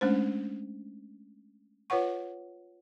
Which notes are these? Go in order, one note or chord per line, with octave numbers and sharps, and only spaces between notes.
G#3 A3 C#4 D4 C5
F4 B4 C#5 F#5 C#6